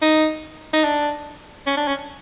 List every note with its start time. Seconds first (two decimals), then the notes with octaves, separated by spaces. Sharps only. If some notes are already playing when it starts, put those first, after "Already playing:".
0.02 D#4
0.73 D#4
0.84 D4
1.67 C#4
1.77 D4
1.88 C#4